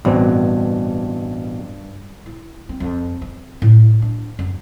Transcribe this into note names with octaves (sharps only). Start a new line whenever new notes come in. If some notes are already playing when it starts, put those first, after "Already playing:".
A1 G2 B2 C4
E4
C4
F2
C4
A2
D4
F#2